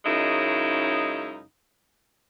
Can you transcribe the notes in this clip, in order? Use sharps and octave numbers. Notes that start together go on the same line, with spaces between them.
F#2 C#3 G#3 D#4 E4